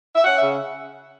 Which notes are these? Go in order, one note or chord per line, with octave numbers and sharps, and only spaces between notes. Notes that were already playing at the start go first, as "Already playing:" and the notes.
E5
C#4 F#5
C#3 E5